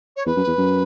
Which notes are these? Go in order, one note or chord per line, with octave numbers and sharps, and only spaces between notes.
C#5
E2 B4
F#2
E2
F#2